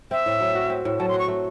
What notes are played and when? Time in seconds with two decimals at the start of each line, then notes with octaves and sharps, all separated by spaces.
0.11 C4 E5
0.26 A2
0.40 F#3
0.55 F#4
0.70 C4
0.85 A2
0.99 F#3 A5
1.09 C6
1.14 F#4
1.19 C#6
1.28 A3